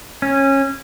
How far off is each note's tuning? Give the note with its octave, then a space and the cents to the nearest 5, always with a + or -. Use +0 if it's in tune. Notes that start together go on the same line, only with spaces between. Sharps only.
C#4 -20